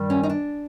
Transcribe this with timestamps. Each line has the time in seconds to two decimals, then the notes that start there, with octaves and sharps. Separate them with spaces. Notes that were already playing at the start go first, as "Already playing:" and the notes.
Already playing: G2 D#3 G3
0.10 C#4
0.23 D#4
0.30 D4